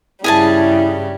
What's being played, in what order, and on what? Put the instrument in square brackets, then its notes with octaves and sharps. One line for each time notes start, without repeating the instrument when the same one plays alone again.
[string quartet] G2 C#3 G3 [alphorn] E4 [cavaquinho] G#4 G#5 A5